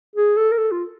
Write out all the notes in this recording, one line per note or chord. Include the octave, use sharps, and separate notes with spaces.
G#4
A4
A#4
A4
F4